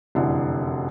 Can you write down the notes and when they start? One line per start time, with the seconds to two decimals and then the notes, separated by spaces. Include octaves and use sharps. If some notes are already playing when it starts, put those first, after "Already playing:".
0.15 F1 F#2 D3 E3